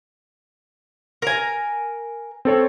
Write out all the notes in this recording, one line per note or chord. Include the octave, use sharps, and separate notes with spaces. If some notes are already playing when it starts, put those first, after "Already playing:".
A#4 G#5
C4 A4 C#5